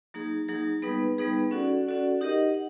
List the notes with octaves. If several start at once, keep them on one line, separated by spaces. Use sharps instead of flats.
F#3 A#3 D#4 G#4
F#3 A#3 D#4 G#4
G3 B3 D#4 G#4 B4
G3 B3 D#4 G#4 B4
C#4 F#4 A4 D5 F#5
C#4 F#4 A4 D5 F#5
D#4 G4 A#4 D#5 F#5
F#5